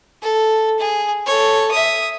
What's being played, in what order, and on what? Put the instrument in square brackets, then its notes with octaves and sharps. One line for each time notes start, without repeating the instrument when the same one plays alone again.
[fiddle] A4
G#4
A4 C#5
E5 D#6